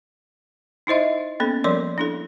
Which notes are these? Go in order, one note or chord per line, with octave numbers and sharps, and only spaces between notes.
D#4 E4 C5 D#5 E5
A#3 B3 C#4 A4
F3 G3 A#4 C#5 D5 C6
D4 E4 A4